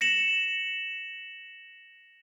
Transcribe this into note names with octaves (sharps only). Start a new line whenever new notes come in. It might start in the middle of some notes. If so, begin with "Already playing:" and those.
A#6 C#7 E7 F#7